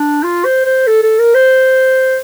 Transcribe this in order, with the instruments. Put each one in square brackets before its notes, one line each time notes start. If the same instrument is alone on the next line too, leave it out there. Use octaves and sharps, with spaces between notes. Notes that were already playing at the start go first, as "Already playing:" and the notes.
Already playing: [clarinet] D4
F4
C5
C5
A4
A4
A#4
C5